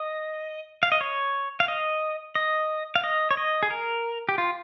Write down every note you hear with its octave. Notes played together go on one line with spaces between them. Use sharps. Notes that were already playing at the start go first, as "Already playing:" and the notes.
Already playing: D#5
F5
D#5
C#5
F5
D#5
D#5
F5
D#5
C#5
D#5
G#4
A#4
G4
F4